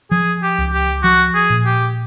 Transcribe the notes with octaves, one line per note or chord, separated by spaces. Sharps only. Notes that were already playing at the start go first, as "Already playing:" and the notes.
F3 G#4
G4
C#2
G4
F3 F#4
G#4
A#2
G4